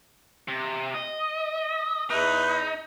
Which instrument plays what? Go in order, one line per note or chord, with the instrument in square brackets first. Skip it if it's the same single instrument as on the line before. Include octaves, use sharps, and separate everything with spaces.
[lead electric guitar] C3
D#5
[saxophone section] E2 B4 E5 [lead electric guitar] D#4